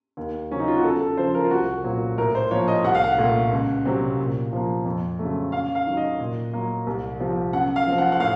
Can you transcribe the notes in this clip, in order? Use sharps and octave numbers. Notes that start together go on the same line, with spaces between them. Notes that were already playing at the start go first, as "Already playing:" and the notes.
D#2
C#3 F#3 C4 C#4
D#4
F4
F#4
F#2 A4
A4
C#3 F3 C5
A#4
F4
C2 F#4
A#2 F#3 C4
A2 A#4
C5
F3 A#3 C#5
D#5
C2 F#5
F5
F#5
A#2 A3
C#2
C3 F#3 C4
A#2
F3 A#3
F2
C#3 F#3 A3
F#2 F5
F5
D#3 F#3
D#5
A#2
F#3 A#3
C2
C3 F3
F#2 F#5
F5
F3 C4
F#5
F#5
A2 F5